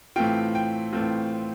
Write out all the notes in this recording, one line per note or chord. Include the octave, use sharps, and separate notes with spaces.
A2 E3 A3 C4 F4 G5
G5
A2 E3 A3 C4 F4